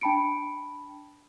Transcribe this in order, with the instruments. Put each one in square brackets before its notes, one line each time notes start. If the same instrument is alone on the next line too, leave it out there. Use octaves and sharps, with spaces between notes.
[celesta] D4 G5 A5 B5 C#7 D7